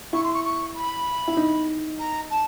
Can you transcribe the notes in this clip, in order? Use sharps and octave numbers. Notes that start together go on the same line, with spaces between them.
E4 C#6
C6
C#6
C#6
B5
E4
D#4
A#5
A5